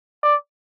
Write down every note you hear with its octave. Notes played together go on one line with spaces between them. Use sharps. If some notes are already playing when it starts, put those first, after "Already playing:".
D5